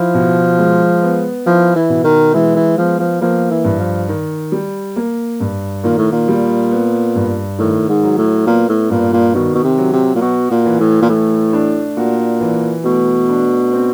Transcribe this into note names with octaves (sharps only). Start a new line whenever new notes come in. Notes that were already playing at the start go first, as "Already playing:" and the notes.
Already playing: F3 E4
B2
G#3
B3
F3 E4
E3
B2
D#3
E3 G#3
E3
F3 B3
F3
F3 A#3
E3
G2
F3
D#3
G3
A#3
G2
A#2 D#3
A2
A#2
G3
B3
G2
A2 D#3
G#2
F#3
A2
A#2 B3
A2
G2 A#2
A#2
B2 D#3
B2
C3
F#3
C3
A#2
B2 F#4
A#2
E3
A2
A#2
A2 A3
D4
A#2 F#4
E3
B2 A3
D4
C4